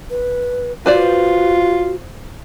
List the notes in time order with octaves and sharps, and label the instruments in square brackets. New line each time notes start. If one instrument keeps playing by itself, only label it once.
[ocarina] B4
[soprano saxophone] F4 [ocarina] F#4 [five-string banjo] B4 C5 D5